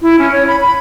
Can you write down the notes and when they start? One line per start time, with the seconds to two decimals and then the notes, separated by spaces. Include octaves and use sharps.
0.02 E4
0.19 C#4
0.32 C#5
0.47 B5
0.61 B5